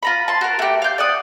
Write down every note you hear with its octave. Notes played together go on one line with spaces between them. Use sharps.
F4 A#5 B5
A5 C6
F#4 A#4
A3 G4
F5 G6
D5 F#5 D#6